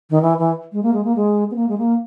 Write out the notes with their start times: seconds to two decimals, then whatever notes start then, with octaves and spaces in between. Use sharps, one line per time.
0.10 D#3
0.22 E3
0.38 E3
0.73 G#3
0.83 A#3
0.93 G#3
1.04 A#3
1.16 G#3
1.51 B3
1.56 A#3
1.69 G#3
1.78 A#3